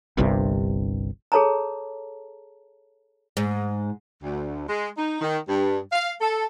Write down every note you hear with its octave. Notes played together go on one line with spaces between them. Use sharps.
G1 C2 G2 C3
G#4 A4 C#5 A5 A#5
G#2
D2
G#3
D#4
D#3
G2
F5
A4